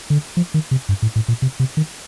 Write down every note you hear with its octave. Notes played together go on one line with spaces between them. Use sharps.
D3
F3
D#3
C3
G2
A2
A2
A#2
C3
C3
D#3